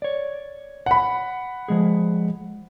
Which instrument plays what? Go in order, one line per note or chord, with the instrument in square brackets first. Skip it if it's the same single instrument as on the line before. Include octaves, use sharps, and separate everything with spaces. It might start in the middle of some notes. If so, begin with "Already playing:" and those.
[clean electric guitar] C#5 D5
[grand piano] F#5 B5
[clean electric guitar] F3 G#3 G#4